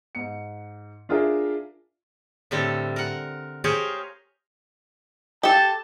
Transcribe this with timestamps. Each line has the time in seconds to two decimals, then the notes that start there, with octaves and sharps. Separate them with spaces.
0.15 G#2 C#7
1.09 D4 F4 G#4 A#4 E5
2.51 A2 D3 G3 C4 A4
2.96 A#4 F#5
3.64 G4 G#4 A#4 C5 C#5 F5
5.43 G4 A4 A5